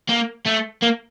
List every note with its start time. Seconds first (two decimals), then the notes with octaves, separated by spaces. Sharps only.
0.09 A#3
0.46 A3
0.82 A#3